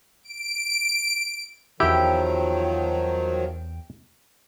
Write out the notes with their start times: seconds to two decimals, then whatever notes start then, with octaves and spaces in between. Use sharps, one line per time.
0.23 D7
1.80 E2 D#3 F3 F#3 E4 G4 G5 D7